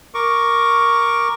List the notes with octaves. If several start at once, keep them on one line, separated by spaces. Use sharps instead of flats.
A#4 C#6 D6